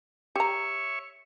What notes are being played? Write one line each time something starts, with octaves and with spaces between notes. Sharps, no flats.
G4 C#5 E5 A#5 C#6